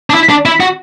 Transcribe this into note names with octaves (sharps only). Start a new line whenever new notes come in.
D4
E4
D4
E4
F#4